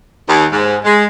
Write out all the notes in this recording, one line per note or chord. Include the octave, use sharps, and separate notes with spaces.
D#2
G#2
G#3